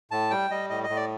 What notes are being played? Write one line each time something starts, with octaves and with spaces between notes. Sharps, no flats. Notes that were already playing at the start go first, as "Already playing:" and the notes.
A2 A5
G3 G5
G3 D#5
A2 D#5
D#5
A2
D5